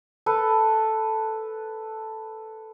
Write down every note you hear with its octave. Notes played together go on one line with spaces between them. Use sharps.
A4 B4